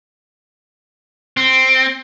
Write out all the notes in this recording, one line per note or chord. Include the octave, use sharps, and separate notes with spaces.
C4